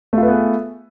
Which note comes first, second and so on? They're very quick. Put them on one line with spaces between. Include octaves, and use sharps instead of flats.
A3 F4 B4 B3 G#4